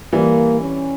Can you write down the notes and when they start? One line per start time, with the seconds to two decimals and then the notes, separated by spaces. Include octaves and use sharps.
0.13 E3 G3 A#3
0.60 C#4